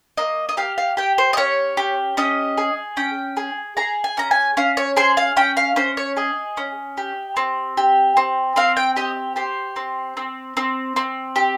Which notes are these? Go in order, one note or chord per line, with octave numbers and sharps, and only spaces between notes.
A#3 D#5
D#5
G4 F5
F5
G4 G5
C5
D#5
C#4 C#5
G4
C#4 D#5
G#4
C#4 G5
G#4
G#4 A#5
G#5
C#4 A#5
G#5
C#4 F5
C#5
G#4 C5
F5
C#4 G5
F5
C#4 C5
C#5
G#4 D#5
C#4
G4
C4
G4
C4
C4 F5
G5
G4 D#5
G4 C5
C4
C4
C4
C4
G4